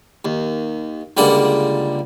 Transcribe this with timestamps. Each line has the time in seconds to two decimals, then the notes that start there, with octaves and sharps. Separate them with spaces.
0.25 D#2
1.17 C#2 D3 G3 A#3 F#5